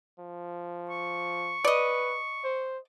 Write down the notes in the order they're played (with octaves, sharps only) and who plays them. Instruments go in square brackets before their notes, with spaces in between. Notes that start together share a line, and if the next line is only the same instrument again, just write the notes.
[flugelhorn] F3
[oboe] C#6
[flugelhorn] B4 [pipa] D5 D#5
[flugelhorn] C5